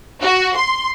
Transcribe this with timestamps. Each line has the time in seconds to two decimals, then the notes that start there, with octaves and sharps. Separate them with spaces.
0.22 F#4
0.57 C6